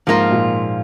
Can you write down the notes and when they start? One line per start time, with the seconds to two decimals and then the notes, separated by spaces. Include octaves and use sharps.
0.07 G#2 F3 A#3 F4
0.31 A#2